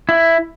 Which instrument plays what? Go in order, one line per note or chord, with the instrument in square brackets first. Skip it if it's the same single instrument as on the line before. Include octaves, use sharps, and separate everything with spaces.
[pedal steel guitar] E4